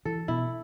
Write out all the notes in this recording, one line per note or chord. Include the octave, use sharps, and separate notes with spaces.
E3 A4
B2 E4